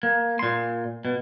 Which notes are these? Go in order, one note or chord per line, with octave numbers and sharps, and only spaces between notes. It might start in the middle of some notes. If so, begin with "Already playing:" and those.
A#3
A#2 C6
B2